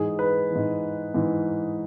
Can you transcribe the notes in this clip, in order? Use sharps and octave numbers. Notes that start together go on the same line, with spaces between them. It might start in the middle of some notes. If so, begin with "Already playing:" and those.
Already playing: G#2 E3 G#4
B4
G#2 E3
G#2 E3